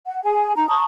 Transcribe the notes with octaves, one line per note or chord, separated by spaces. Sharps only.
F#5
G#4 G#5
D#4 A#5
A5 A#5 C#6 D#6